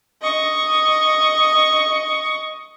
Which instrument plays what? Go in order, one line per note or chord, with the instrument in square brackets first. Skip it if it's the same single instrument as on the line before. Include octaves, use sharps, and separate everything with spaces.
[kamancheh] D#5 C#6